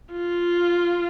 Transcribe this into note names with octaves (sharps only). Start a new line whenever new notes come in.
F4